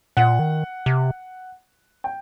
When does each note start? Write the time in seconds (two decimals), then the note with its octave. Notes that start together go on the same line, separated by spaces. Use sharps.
0.17 A#2 F#5
0.39 D#3
0.86 C3
2.04 G5